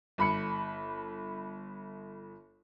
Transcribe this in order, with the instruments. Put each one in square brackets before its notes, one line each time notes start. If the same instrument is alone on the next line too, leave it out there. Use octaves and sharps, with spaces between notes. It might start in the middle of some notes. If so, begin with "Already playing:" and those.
[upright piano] G1 B5 C#7